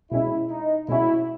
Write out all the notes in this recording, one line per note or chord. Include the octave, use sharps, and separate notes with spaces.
B2 G#3 C#4 E4
D#4
B2 G#3 C#4 E4 F#4